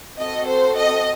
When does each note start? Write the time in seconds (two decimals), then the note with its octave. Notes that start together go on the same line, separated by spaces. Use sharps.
0.18 C4 F#4 A4 D#5
0.48 C5
0.76 D#5